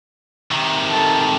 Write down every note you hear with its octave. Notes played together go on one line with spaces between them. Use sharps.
C3 D#3
A4